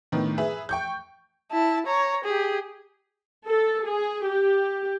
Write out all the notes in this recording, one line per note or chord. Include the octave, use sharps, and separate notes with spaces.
A2 D#3 B3 D4
G#4 B4 E5
G5 C#6 G6
E4 A5
C#5 A#5
G4 G#4
A4
G#4
G4